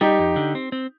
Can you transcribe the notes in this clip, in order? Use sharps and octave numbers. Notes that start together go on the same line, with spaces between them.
G3 D#4 G4
F2
D3
C4
C4